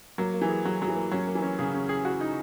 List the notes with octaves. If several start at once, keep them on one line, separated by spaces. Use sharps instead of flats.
F#3 A#3
A#3
E3
G#4
F#3 G#4
F#3 G#4
E3
A#3
F#3 C#4
A#3
E3
C#4
C#3 G#4
C#4
G#4
F#4
D#4